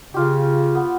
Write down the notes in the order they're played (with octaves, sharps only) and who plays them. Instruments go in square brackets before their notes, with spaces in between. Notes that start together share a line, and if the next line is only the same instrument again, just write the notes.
[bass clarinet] C#3 [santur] F4 G4
[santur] B3